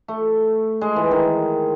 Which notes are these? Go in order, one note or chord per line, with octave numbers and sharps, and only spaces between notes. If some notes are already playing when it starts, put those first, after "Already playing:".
A3
G#3
E3
D#3